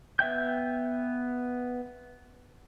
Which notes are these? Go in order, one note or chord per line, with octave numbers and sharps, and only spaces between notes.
B3 E5 G5 G6